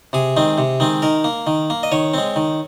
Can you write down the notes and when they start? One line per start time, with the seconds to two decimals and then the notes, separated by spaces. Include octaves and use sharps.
0.13 C3 G#4
0.37 D#3 G#3 C4
0.58 C3
0.80 D#3 G#3 C4
1.02 D#3 A#4
1.24 A#3
1.47 D#3
1.70 A#3
1.83 D#5
1.92 D#3 C#5
2.14 G#3 C4
2.36 D#3